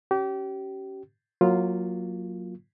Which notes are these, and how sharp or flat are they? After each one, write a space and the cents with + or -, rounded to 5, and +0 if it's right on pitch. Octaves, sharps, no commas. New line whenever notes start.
C#4 +0 G4 -30
F#3 -15 A#3 +0 F4 -5